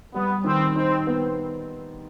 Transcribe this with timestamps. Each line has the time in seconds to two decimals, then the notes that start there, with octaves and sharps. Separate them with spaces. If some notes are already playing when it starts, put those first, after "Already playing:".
0.14 G3 B3
0.44 D#3 C4
0.76 C4 D#4
1.07 B3